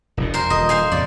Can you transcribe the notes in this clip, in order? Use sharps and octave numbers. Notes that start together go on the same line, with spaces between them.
E1 F#2 B2
E2 A#4 C5
D#1 D#5
C5 F5 G#5
F2 A#2 C#3 D5